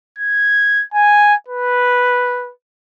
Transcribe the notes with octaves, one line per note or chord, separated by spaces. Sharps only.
G#6
G#5
B4